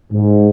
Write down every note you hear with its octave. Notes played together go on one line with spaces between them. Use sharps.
G#2